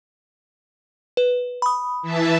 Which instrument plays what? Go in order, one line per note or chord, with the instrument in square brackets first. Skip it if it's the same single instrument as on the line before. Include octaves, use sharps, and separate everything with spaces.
[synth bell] B4
B5 D#6
[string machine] E3 E5 A5